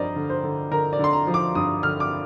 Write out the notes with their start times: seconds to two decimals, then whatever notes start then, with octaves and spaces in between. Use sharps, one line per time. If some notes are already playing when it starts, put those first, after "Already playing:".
Already playing: G2 F3 A#4 C5 D5 D#5
0.16 D3
0.30 C5
0.43 D3
0.71 D3 A#4
0.93 D5
0.99 D3 C6
1.13 A#5
1.27 F3
1.34 D6
1.55 G2 D#6
1.83 D3 F6
2.00 D6